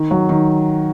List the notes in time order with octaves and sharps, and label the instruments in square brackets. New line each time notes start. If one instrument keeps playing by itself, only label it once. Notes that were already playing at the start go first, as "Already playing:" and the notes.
Already playing: [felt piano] D#3
F#3
D#3